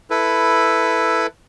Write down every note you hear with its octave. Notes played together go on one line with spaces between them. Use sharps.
E4 A4 B4